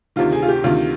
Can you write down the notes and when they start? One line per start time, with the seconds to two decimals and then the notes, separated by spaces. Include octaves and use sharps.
0.16 D2 C3 D#3 F4
0.32 G#4
0.42 F4
0.48 G4
0.64 D2 C3 D#3 F4